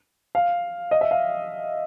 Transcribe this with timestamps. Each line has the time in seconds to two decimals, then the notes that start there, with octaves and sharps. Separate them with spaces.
0.35 F5
0.91 D#5
1.01 E5
1.11 F5